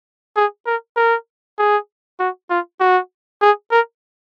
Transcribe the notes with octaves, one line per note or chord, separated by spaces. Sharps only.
G#4
A#4
A#4
G#4
F#4
F4
F#4
G#4
A#4